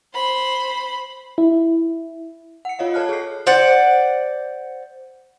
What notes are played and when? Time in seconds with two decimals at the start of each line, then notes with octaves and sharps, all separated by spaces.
0.14 C5 B5
1.38 E4
2.65 F#5 C#7
2.79 F4 C#5 D#5 F5
2.94 A4 C#5 A5 F6 F#6
3.09 G#4 C7
3.47 C5 D5 F#5